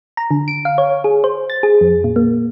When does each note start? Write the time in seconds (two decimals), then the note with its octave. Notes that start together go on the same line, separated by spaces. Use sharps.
0.17 A#5
0.31 D3
0.48 D7
0.65 F5
0.78 C#5
1.04 G#4
1.24 C5
1.50 A6
1.63 G#4
1.81 F2
2.04 A#2
2.16 A#3